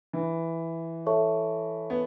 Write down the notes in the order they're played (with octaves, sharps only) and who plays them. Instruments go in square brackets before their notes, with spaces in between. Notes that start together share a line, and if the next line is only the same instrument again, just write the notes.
[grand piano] E3
[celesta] A4 C#5 E5 A5 C#6
[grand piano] B3